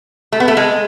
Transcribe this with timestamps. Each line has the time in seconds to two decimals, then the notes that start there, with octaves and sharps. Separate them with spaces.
0.32 A3
0.40 B3
0.48 A3
0.57 G#3